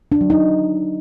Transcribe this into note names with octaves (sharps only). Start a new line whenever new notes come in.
D4
F#3
D#4